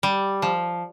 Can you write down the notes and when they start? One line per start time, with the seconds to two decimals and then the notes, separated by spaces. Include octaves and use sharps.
0.03 G3
0.42 F3